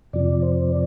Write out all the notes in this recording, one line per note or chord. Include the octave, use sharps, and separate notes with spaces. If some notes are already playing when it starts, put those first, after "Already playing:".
F2 C3 F3 D5
C5
D5